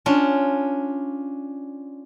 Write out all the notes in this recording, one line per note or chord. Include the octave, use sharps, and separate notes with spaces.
C#4 D4 F4